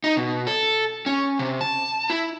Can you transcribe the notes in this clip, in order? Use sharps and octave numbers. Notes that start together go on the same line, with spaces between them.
D#4
B2
A4
C#4
C3
A5
E4